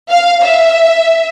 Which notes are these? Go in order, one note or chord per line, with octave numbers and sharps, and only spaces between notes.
F5
E5